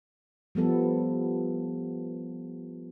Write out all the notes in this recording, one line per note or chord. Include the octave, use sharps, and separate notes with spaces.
F3 G3 B3 A4